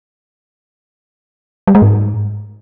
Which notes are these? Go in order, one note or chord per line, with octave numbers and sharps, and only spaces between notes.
G3
G#3
G#2